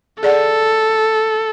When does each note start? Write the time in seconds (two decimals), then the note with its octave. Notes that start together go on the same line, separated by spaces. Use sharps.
0.23 G#4 A4 D5 F#5